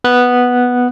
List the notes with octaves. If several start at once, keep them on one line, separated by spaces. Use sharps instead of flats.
B3 F#6